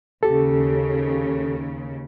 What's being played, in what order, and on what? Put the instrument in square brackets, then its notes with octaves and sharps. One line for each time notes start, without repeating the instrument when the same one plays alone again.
[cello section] D#2 C#3 [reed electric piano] G4 A4